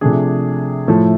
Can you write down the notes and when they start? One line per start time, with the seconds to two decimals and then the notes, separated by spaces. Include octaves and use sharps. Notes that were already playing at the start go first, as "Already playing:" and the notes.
0.01 C3 F3 A3 D4 G#4
0.88 A2 F3 A3 E4 A4